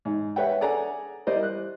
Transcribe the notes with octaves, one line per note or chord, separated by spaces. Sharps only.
G#2
B4 C#5 E5 F#5 G5
G#4 A4 D5 F#5 G#5 A#5
G3 E4 A#4 C5 D5 D#5
F#6